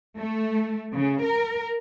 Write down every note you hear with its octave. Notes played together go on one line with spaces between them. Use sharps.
A3
C#3
A#4